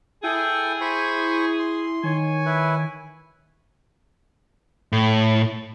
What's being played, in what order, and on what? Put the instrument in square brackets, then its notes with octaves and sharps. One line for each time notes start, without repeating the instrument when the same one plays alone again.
[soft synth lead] E4 [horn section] G#4 [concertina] A4 G5
[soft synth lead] E4 [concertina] C5 B5 C#6
[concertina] C6
[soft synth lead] D#3 [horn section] C#5 G#5
[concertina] E4 B4
[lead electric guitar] A2